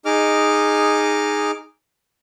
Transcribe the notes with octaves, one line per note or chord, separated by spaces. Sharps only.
D#4 G#4 D#5 D6 F6